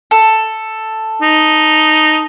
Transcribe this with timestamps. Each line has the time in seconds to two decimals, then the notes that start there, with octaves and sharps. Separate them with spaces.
0.11 A4
1.21 D#4